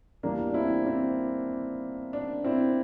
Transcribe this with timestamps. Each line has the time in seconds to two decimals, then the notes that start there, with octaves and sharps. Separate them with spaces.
0.23 E2 E3 G3 A#3 D4
0.50 D4
0.54 C4 E4
0.86 C4 E4
2.13 D4
2.44 C4 E4